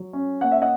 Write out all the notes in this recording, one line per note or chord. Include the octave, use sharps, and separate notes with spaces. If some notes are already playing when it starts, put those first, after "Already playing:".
Already playing: F#3
C#4
A#3 F#5
E5
D#5 F#5